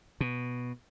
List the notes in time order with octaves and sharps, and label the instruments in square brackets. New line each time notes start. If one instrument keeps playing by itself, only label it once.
[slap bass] B2